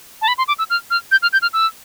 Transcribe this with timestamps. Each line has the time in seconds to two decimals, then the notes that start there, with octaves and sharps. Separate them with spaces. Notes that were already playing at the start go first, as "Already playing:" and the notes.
0.22 A5
0.28 B5
0.38 C6
0.48 D6
0.59 E6
0.70 F6
0.91 F6
1.12 G6
1.22 F6
1.33 G6
1.42 F6
1.53 E6